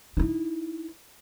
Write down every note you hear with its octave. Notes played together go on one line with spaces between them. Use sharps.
D#4 E4